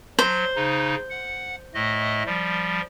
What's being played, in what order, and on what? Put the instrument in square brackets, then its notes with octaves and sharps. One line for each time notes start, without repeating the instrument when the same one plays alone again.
[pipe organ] F#3 [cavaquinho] C5
[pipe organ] C#3 D#4
F#5
A2 A3 D#5
F3 G3